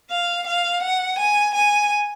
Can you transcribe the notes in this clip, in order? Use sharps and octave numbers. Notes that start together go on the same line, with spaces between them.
F5
F5
F#5
G#5
G#5